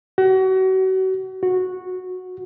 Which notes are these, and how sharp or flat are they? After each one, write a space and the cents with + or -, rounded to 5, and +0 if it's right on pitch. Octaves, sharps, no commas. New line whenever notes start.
F#4 +35
F#4 -10